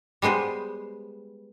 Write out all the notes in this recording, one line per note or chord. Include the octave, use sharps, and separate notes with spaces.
G3 G#3 B3 C5